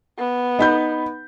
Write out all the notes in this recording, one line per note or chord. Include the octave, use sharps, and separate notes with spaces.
B3
D#4 B5 G6